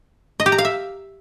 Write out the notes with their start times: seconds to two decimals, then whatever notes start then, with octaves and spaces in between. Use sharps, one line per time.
0.40 D#5
0.46 G4
0.52 A#5
0.58 F5
0.65 E5